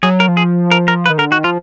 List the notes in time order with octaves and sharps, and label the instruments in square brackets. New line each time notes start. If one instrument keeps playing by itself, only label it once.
[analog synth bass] F#3 [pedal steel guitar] G#4
[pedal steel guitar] A#4
[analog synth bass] F3
[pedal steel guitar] G#4
A#4
A#4
B4
[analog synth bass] D#3
[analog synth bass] D3 [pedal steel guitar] A#4
[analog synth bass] D#3 [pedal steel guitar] F#4
[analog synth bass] F3 [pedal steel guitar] F4